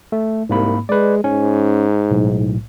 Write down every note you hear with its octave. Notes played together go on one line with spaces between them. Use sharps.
A3
C2 G#2 A#3 B5
G#3 B4 D5
G#2 C#4
B1 A2